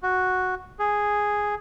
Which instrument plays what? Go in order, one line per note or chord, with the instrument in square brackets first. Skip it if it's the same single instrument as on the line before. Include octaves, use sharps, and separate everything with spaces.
[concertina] F#4
G#4